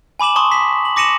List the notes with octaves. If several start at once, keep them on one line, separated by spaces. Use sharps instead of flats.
G#5 B5 D6 E7 F#7
A5 C6 C#6 D#6
B6
F#7
D6 A#6 C#7 D#7 E7 F#7